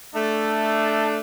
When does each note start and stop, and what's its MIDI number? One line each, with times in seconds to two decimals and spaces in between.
0.14 1.20 57
0.14 1.20 62